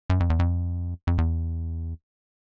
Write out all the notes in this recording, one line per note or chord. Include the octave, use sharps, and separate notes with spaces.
F#2
F2
E2
F2
F2
E2